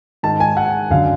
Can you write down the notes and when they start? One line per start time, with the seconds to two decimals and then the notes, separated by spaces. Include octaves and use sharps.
0.23 G#2 D#3 A5
0.40 G#5
0.57 F#5
0.90 F#2 D3 F5